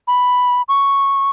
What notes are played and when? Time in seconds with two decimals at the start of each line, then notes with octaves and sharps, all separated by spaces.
0.08 B5
0.68 C#6